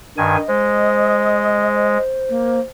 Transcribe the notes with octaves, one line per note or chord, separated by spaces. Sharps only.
G2 D#3 D#5 G#5
G#3 C5
A#3